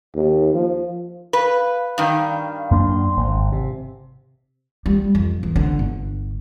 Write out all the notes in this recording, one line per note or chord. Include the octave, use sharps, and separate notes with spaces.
D#2
F3
B4 F5
G2 D#3 F5
F#2 A#3 D4 C6
G#1
C3
G3
F2
E2
D3
G1